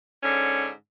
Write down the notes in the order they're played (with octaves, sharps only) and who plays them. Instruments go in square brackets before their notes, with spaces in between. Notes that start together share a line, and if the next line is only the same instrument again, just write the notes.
[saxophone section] G#2 D3 C#4